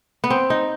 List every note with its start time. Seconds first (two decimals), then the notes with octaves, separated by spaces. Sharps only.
0.24 B3
0.30 C4
0.50 D#4